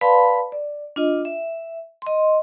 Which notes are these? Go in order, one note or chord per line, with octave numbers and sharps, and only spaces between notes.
B4 D5 F5 A5 B5 C6
D5
D4 F4 D#5
E5
D#5 C6